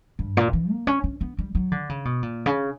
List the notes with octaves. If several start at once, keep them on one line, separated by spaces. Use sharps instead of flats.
G2
A#2
E3
A#3
C#4
C#4
B3
G3
F#3
D3
C#3
B2
A#2
C#3